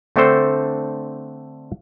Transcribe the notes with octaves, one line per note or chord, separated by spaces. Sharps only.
D3 A3 C4 D4 A4 C5